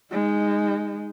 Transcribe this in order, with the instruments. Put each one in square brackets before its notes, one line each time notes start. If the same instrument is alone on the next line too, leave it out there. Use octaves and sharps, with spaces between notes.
[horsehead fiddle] G#3 D#4